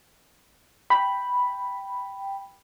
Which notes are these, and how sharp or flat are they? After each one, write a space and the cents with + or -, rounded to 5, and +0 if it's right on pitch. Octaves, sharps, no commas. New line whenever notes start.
G5 +0 B5 +0